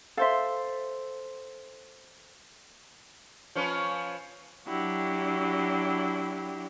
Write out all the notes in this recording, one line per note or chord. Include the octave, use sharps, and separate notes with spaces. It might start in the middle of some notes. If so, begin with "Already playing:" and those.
A4 C5 E5 F5 C6
F3 C#4 B4
F#3 D4 E4 F#4 G4